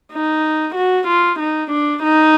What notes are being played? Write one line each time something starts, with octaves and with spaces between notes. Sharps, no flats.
D#4
F#4
F4
D#4
D4
D#4